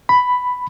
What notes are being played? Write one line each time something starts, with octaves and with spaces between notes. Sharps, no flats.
B5